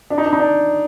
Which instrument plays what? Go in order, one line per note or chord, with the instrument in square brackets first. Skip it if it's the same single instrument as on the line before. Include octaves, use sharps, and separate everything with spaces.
[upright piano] D4
D#4
D4
D#4
D4